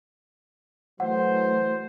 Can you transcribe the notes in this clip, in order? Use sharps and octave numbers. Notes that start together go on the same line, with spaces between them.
E3 F#3 A3 C5 F#5